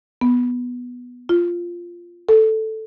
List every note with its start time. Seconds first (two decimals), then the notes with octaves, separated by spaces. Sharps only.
0.21 B3
1.29 F4
2.29 A4